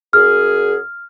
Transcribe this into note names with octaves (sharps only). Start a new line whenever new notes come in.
F#2 G#4 F6